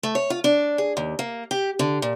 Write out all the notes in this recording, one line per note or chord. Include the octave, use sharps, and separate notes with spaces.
A3
C#5
F4
D4
G#4
D#2
A#3
G4
D3
A#2